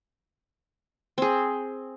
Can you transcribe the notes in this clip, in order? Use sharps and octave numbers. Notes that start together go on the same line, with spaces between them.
C4 G#4